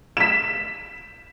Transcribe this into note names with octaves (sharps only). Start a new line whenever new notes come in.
B6 E7